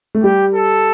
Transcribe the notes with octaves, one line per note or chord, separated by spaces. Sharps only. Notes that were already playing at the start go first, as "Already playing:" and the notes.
A3
G3 G4
A4